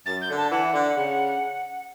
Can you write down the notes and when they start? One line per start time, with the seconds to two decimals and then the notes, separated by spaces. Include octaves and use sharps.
0.06 F#2 A6
0.21 G6
0.29 D3
0.36 A5
0.51 E3 F#5
0.73 D3
0.96 C#3